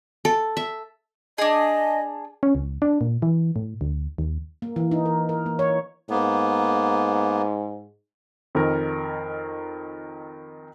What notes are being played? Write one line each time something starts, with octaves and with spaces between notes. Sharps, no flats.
A4
E5
D4 G#4 D#5
C#4
C#2
D4
A#2
E3
A2
D2
D#2
A#3
E3
D#4
A#4
A#4
A#3
C#5
G#2 A#3 B3
F2 D#3 A#4